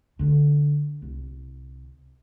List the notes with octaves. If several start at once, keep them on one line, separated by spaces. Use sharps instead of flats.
D3 D4
C2